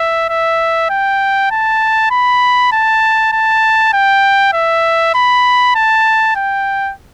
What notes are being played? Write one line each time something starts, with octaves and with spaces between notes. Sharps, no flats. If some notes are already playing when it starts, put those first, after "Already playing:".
Already playing: E5
E5
G5
A5
B5
A5
A5
G5
E5
B5
A5
G5